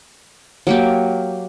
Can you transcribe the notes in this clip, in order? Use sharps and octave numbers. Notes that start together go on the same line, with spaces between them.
F#3 A#3 G4